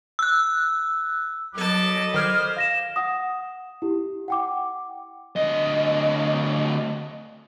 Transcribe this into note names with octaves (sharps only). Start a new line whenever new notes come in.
E6 F#6
F#3 A4 D#5 A5 B5 D6
D#3 C5 F6 G#6
F5 A#6 E7
F#5 D#6
E4 G4
F#5 G5 D6
D2 D#5